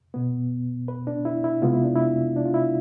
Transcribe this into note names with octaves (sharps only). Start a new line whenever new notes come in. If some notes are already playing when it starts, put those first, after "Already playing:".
B2 B3
B4
D4
E4
E4
C3 G#3 B3 F4
E4
D4
E4
D4
F4
E4